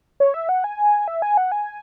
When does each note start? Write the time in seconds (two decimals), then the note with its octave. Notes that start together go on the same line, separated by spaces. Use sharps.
0.20 C#5
0.34 E5
0.49 F#5
0.64 G#5
1.08 E5
1.22 G#5
1.37 F#5
1.52 G#5